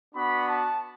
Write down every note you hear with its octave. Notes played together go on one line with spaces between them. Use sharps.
B3 D4 F#4 B5
A5